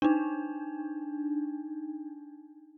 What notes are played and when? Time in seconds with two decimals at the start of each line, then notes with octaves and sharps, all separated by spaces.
0.02 D4 D#4